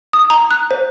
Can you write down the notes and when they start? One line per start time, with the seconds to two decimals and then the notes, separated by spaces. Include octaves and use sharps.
0.13 D#6
0.30 A#5
0.51 F#6
0.71 C5